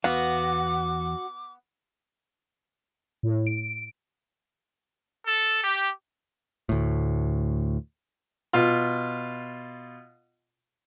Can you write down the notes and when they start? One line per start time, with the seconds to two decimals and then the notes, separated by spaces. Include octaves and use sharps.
0.04 E2 B3 F#4 F5 D6
3.23 A2
3.47 D7
5.26 A4
5.64 G4
6.69 D2 A2
8.53 B2 F4